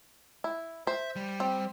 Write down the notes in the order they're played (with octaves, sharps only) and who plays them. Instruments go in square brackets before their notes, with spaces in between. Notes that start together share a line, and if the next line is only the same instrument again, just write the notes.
[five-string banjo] E4
[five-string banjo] C5 [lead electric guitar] E5
[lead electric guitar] G3
[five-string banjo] C4